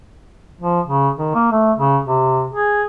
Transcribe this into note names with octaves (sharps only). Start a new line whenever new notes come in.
F3
C#3
D#3
A#3
A3
C#3
C3
G#4